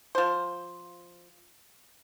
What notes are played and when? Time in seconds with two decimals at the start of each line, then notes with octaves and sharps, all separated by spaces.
0.15 F3 C5